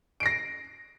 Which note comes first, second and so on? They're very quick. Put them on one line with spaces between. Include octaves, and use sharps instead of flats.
D7 C7 A#6